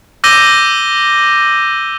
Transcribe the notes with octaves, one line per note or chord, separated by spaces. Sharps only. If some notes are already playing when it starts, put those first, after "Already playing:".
D6 E6 G6 A#6 D#7 G7